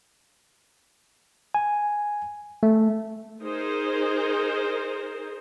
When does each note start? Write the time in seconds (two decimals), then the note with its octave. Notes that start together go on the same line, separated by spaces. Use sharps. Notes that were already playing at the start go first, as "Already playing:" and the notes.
1.55 G#5
2.63 A3
3.43 D#4 G#4 A#4 C5